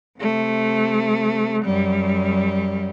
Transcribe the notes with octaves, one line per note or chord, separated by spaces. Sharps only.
C3 A3
F#2 G3